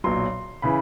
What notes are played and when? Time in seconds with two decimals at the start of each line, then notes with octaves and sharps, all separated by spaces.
0.04 B1 A#2 F#3 C6
0.62 C#3 E3 B5